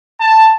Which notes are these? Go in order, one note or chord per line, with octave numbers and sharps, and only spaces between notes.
A5